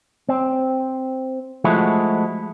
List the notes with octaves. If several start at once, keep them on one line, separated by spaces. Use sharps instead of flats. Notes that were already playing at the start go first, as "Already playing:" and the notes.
C4
F3 G#3 A3 E4 F#4